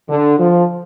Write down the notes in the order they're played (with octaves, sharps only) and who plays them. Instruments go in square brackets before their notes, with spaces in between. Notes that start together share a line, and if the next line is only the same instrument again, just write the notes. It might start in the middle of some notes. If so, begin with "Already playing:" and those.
[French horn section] D3
F3